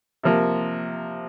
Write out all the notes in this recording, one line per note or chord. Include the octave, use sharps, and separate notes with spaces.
C3 F3 A#3